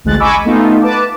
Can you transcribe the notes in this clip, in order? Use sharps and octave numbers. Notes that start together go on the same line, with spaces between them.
A1 D2 G#3 F#6 A6
D#5 G#5 B5 C#6 D6 E6
A3 B3 D#4 F4
B4 A5 D6